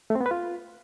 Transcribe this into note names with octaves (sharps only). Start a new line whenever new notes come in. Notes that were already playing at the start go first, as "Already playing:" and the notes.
A3
C4
B3
B4
F4